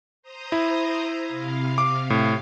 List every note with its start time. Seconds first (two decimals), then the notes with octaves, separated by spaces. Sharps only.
0.22 C5 A#5 D#6
0.52 E4
1.26 C3 F5
1.78 D6
2.10 A2